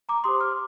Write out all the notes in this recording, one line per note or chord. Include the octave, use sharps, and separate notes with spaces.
A#5 D6
G4 C5 C6 D#6
D6 F6